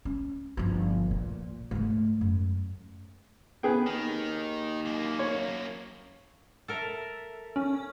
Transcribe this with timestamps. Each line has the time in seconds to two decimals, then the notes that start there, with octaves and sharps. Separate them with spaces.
0.05 C#4
0.57 G1 F3
1.11 A#2
1.71 G#2 A3
2.21 F#2
3.63 C#3 B3 G#4 G5
3.87 D#2 D#3
4.86 F#2 A#3
5.19 C#5
6.68 A4 A#4 E5
7.56 C#4